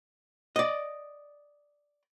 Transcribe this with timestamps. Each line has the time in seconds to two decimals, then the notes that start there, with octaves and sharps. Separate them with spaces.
0.56 D5 D#5